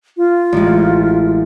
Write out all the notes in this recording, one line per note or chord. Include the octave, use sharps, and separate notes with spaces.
F4
A1 G#3